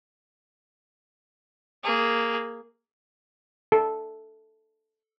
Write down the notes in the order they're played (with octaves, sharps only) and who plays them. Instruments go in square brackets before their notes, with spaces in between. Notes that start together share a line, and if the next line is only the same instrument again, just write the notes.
[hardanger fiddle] A#3 G#4
[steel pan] A4